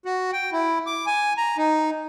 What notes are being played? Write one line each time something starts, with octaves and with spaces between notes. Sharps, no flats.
F#4
G5
E4
D6
G#5
A#5
D#4